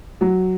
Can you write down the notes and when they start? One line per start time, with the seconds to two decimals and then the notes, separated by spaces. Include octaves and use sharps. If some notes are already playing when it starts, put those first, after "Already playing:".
0.21 F#3